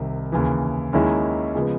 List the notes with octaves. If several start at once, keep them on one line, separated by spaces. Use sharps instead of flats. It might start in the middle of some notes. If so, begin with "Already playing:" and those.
Already playing: C2 C3 D#3
D#2 C#3 E3
D#2 D#3 G#3 C#4 E4
C#3 F3 G#3 B3